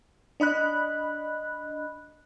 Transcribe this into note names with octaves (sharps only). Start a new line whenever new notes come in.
D4 D#5 B5 F#6